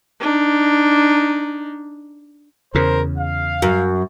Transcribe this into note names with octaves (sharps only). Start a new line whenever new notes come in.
D4 D#4
E2 C#3 A#4 C5
F5
F#2